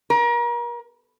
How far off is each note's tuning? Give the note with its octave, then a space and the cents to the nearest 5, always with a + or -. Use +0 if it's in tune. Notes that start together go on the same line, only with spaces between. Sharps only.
A#4 +35